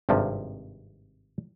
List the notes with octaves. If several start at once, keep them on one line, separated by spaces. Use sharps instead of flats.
G#1 G2 C3 F3